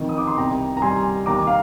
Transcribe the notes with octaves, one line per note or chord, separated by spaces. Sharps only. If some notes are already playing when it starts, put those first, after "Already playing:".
Already playing: F2 D#3
D#6
D6
C6
C2 G5 A#5
A#5
G3 G#5 C6
D#2 A#5 D6
F5